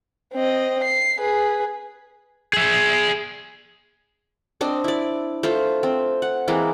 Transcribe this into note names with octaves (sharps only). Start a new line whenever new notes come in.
C4 D#5
C7
G#4 B4
G#4 E5
C4 D4 D#5
E4 D5
A3 F4 C5
C4
F#5
E3 G#3 A#3 C4